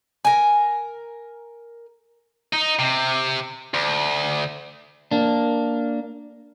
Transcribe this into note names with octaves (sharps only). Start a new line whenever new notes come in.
A#4 G#5
D#4
C3
D2
A#3 D4